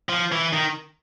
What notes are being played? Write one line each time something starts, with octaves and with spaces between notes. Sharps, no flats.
F3
E3
D#3